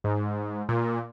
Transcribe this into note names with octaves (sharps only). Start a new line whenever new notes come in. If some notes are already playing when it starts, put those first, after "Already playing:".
G#2
A#2